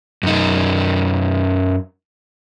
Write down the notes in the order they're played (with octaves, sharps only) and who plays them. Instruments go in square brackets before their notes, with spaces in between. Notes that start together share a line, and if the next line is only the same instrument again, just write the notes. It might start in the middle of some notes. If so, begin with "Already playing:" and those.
[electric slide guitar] F#2 D#4